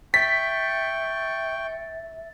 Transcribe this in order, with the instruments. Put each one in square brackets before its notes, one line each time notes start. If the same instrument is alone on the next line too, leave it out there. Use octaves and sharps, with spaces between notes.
[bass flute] E5 [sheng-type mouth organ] G5 C#6 [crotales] A6 [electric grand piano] B6